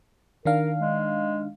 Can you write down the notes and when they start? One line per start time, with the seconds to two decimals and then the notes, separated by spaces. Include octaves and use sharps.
0.45 D#3 D4 A#4 F5
0.80 G#3